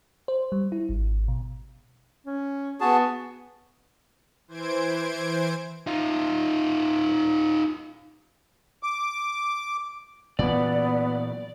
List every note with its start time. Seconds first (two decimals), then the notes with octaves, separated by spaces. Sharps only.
0.28 C5
0.52 G3
0.72 E4
0.89 G#1
1.28 B2
2.26 C#4
2.81 B3 F#4 G#4 A5
4.48 E3 C5 G#6 D7
5.87 D#4 F4
8.83 D6
10.39 A#2 E3 F#3 B3 D5